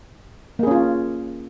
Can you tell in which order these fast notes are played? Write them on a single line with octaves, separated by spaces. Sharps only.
A#3 G#4 C#4 F4